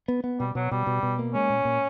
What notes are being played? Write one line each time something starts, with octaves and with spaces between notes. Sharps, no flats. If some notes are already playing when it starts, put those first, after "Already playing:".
B3
B3
B2 G3
B2 F#3
B2 G3
B2
B2
A#3
G#3 C#4
A#2
A#2